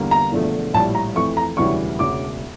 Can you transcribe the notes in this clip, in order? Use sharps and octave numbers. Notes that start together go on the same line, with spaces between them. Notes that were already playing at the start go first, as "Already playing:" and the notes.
Already playing: E2 D3 G3 A#3
A#5
E1 E2 D3 F3 A3
A#1 A2 G3 A5
A#5
F2 E3 A3 C#6
A#5
E1 D2 C#3 E3 G3 C#6
E1 D2 C#3 D6